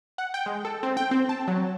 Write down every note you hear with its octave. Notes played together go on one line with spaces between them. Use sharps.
F#5
G5
G#3
A4
C4
G5
C4
A5
F#3